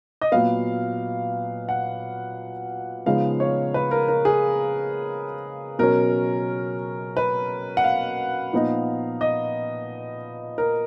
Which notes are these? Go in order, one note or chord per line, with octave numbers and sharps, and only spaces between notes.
D#5
A#2 F#3 B3 F5
F#5
C#3 F3 G#3 B3 D#4 F5
C#5
B4
A#4
A#4
G#4
B2 F#3 C#4 A#4
B4
F#5
F5
A#2 F3 B3 D#4
D#5
A#4